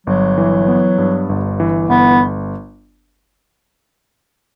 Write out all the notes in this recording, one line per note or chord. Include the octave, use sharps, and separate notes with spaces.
G1 F#3
E3
B3
G2
G1
E3
G1 B3